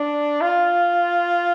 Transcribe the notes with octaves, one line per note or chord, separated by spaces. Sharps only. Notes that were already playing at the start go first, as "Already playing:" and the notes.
Already playing: D4
F4